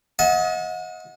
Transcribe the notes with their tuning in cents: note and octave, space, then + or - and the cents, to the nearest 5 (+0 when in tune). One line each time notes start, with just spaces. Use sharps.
D#5 +30 F#5 -40 A5 -45